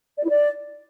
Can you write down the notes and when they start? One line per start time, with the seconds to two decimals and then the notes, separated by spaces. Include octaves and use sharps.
0.18 D5
0.23 E4
0.29 D5